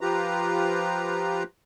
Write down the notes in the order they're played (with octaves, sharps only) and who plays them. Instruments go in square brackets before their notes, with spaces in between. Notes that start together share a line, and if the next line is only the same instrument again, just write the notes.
[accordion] F3 F4 G4 B4 A#5